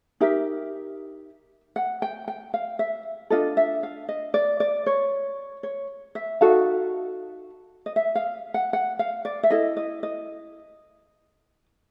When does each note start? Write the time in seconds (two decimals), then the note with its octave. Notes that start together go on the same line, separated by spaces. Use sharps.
0.20 D#4 G4 A#4 E5
1.76 F#5
2.02 G5
2.28 G5
2.54 F5
2.79 E5
3.30 D4 F4 A4 D#5
3.57 E5
3.83 F5
4.09 D#5
4.34 D5
4.60 D5
4.86 C#5
5.63 C#5
6.15 E5
6.41 D#4 F#4 A4 F5
7.86 D#5
7.96 E5
8.15 F5
8.54 F#5
8.73 F#5
8.99 F5
9.25 D5
9.43 E5
9.50 E4 A4 D#5
9.77 D#5
10.03 D#5